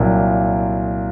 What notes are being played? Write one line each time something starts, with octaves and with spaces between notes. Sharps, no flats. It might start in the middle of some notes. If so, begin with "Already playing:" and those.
Already playing: C2 A#2 F#3 A#3